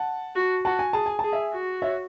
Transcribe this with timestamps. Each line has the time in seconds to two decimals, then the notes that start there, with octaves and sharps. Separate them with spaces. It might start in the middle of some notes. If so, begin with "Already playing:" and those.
Already playing: F#5 A5
0.36 F#4
0.65 F#4 F#5 A5
0.79 G#5
0.93 G#4 A5
1.06 G#5
1.19 G#4 A5
1.32 E5 G#5
1.53 F#4
1.82 C#5 E5